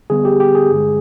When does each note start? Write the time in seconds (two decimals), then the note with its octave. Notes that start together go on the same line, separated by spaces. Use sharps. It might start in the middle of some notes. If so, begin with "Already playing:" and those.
0.10 D3 G3 B3 G#4
0.25 G4
0.40 G4
0.55 G#4
0.71 G2 D3 G#3